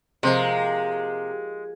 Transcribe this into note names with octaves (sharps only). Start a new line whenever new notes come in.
C3 F3 G#3 A#3 C5 D#5 A#5